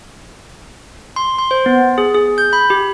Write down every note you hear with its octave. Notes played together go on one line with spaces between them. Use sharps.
C6
C6
C5
B3
G#4
G#4
G6
B5
G4